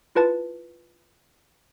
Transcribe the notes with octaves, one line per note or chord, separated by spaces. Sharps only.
E4 F4 B4 A5 A6